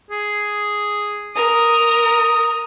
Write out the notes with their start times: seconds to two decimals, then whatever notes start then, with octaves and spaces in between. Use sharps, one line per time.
0.11 G#4
1.35 A#4 D#6